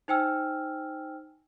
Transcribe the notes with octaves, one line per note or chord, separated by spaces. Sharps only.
D#4 C5 G5 G#5 E6 F6